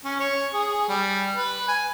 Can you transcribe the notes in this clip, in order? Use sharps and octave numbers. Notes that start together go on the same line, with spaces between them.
C#4
C#5
G#4
G3
B4
G#5